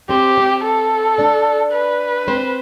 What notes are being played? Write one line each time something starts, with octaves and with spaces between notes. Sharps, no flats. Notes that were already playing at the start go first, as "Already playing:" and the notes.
C4 G4 C5
C4 C5
A4
D4 D5
B4
C4 C5